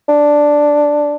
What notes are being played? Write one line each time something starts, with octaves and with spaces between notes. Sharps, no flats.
D4